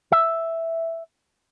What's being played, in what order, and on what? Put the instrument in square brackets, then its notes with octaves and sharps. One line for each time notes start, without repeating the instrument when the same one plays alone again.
[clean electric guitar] E5